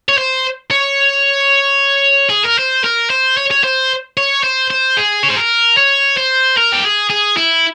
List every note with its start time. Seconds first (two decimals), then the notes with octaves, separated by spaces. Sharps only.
0.09 C#5
0.18 C5
0.71 C#5
2.29 G#4
2.44 A#4
2.58 C5
2.84 A#4
3.10 C5
3.37 C#5
3.51 C#5
3.64 C5
4.17 C#5
4.44 C5
4.70 C5
4.97 G#4
5.23 C#5
5.30 C5
5.37 A#4
5.77 C#5
6.17 C5
6.57 A#4
6.72 G4
6.84 G#4
7.10 G#4
7.37 E4